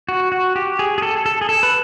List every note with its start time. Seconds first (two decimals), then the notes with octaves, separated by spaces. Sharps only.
0.09 F#4
0.32 F#4
0.56 G4
0.79 G#4
0.98 G#4
1.02 A4
1.26 A4
1.41 G#4
1.49 A4
1.63 B4